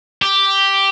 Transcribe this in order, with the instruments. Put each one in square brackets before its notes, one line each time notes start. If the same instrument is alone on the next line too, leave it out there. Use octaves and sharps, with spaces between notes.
[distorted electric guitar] G4